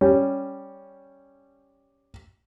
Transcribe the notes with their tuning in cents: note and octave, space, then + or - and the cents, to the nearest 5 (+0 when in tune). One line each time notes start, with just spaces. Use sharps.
G3 +0 C#4 +0